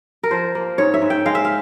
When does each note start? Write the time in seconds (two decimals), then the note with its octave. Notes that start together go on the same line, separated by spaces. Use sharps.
0.23 A#4
0.31 F3 C5
0.55 A#3
0.78 G#2 C#5
0.94 E5
1.02 G#2
1.10 G5
1.26 G#3 F5
1.35 E5
1.45 F5